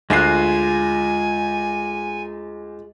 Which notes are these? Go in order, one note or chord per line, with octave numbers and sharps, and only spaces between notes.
D2 G#3 F4 G#5 F#6 C7